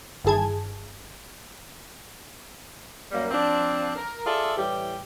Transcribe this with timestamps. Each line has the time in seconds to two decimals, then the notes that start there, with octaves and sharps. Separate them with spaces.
0.24 G1 D#3 E4 G#4 A5 G#6
3.12 F#2 G3 A#3
3.31 F3 C4 D4
3.96 A#4
4.25 F4 G#4 A4 D5 E5
4.57 A2 E3 G3 G4